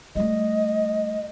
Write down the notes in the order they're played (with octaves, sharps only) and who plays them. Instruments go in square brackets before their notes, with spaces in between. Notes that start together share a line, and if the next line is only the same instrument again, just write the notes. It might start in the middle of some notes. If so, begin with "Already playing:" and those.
[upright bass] G3 A3 [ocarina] D#5